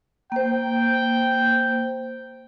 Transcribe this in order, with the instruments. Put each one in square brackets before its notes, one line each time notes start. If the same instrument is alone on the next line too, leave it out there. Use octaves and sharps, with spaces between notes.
[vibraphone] A#3 C5 [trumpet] G5